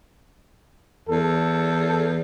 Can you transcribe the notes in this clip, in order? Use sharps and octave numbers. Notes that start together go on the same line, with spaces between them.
E2 A4